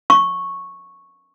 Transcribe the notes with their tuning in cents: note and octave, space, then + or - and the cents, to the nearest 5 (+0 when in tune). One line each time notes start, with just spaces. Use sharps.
C#6 -10